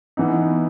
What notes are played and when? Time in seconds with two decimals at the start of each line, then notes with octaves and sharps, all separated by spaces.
0.17 E3 B3 D#4